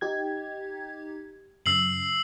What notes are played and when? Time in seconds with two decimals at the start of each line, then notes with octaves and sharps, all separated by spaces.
0.01 D#4 G4 G#6
1.66 F#2 C#3 E6 C7 F#7